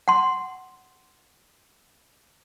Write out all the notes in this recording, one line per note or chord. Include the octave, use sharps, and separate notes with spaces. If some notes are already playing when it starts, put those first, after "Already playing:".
F#5 C6